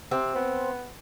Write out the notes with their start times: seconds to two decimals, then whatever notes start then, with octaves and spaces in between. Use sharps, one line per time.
0.11 C3 C4
0.36 B3